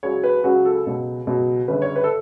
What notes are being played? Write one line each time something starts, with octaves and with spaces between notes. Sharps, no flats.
C#2 C#3 F#3 C#5
B4
C#2 C#3 F#3 F#4
A4
C#2 B2 F#3
C#2 B2 F#3
G1 F#2 C#3 B4
C#5
B4
A4